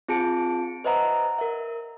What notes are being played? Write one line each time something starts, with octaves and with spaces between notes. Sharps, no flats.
C4 F4 G#4 A5 C#7 D7
B4 C5 D#5 E5 F#5 A#5
A#4 E5